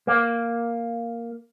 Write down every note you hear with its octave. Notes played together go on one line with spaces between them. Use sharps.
A#3